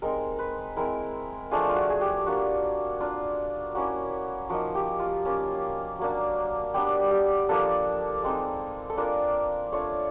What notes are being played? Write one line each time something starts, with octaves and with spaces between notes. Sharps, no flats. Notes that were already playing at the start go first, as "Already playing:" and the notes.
G#3 C4 D#4 A#4
B4
G#3 C4 E4 A#4
F3 A3 D4 F4 G#4
F4
F#4
G#4
G4
A#3 D4 F4 F#4
A#3 D4 F4
A#3 C#4 E4 F#4
F3 A#3 D#4 F#4
G4
F4
A#3 C#4 F4
F#3 A#3 D4
G3 B3 D4 G4
G4
F3 A#3 D4 A4
G#3 C4 D#4
A4
A#3 D4 F4 A#4
A3 D4 F4 C#5